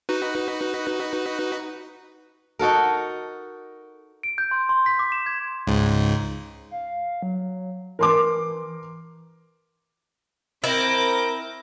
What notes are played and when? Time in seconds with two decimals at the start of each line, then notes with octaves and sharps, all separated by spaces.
0.09 D#4 F#4 B4
2.59 D#4 F#4 A4 A#4
4.23 D7
4.38 G6
4.51 C6
4.69 C6
4.86 B6
4.99 D6
5.12 E7
5.26 G#6
5.67 C#2 G#2
6.71 F5
7.23 F#3
7.99 E3 A#4 C6 D6
10.64 C4 E4 A#4 D6 G6 A#6